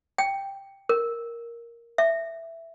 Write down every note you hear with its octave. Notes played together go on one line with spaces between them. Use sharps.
G5
A#4
E5